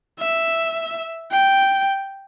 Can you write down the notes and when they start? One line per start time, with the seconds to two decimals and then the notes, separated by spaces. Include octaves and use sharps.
0.19 E5
1.32 G5